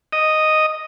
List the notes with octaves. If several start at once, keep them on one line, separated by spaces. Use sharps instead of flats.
D#5